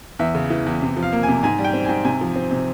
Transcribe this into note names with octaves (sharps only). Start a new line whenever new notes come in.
E2 E5
C#3
E3
E2
C3
F3
F5
A#3
G#5
C3
G#2 G#5
G3
G5
C4
G#2 G#5
C3 G#5
F3
C4
C3